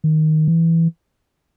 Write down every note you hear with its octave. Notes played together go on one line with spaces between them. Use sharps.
D#3
E3